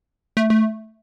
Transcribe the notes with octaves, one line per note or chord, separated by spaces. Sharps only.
A3
A3